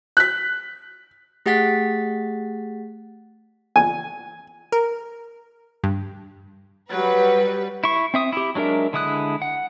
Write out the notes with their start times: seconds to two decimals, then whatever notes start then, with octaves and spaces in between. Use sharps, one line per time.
0.17 F#6 B6
1.46 A3 G4 G#4 F#5 A6 B6
3.76 G#5
4.72 A#4
5.84 G2
6.89 F#3 G3 B4
7.84 E4 C#6
8.14 C4 E5 D#6
8.33 E4 G4
8.55 F#3 G#3 D4 A#4 E5
8.93 D3 G#3 E4 D#6 F#6
9.42 F#5